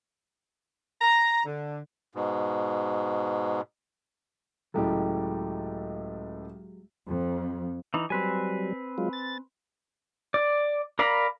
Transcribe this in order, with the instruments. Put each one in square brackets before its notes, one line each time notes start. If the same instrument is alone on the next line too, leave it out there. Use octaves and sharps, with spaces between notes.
[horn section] A#5
D3
[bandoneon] G#2 B2
[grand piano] C#2 A2 A4 [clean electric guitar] F#3 G#3 G4
[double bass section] F2
[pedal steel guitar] E3 D#4
[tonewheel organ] F#3 G3 [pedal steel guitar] C4 B4 G#5
[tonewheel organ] F#3 G#3 F4
A6
[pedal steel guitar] D5
A#4 D5 F5 A#5 B5